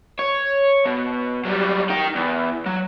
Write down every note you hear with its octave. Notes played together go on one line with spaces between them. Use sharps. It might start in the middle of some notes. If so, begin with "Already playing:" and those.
C#5
B2
F#3 G3
D#4 G5
E2
F#3